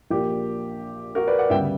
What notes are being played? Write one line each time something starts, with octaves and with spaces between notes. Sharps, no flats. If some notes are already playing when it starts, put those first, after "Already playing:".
A#1 A#2 A#3 D4 G4
F#4 A#4
B4 D5
D5 F#5
D2 C#3 G3 B3 E5 G5